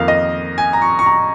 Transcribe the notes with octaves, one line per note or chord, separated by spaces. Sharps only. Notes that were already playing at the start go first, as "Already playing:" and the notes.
Already playing: F2 D#3 A#3 F5
D#5
G#5
A#5
C#6
C#6
A#5